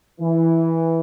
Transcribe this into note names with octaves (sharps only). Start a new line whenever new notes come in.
E3